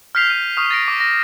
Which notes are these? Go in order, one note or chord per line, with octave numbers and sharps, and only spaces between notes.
F6 G6 B6 C7 F7
F6 D#7 F7
C#6 D#6 F6 F7
A6 A#6 D7
D6
A#6